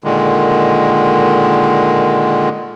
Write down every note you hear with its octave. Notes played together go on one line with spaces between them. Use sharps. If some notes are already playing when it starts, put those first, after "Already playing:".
A#2 D3 D#3 G#3